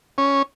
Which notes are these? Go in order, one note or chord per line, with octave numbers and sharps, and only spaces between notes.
C#4